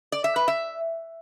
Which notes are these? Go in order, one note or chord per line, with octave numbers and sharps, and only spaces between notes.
D5
E5
B4
E5